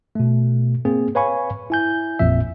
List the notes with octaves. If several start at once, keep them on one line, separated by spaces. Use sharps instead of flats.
B2 A3
A#3 C4 G#4
B4 C#5 F5 G#5 B5 C#6
E4 G#5 G6
A1 F2 A#2 E5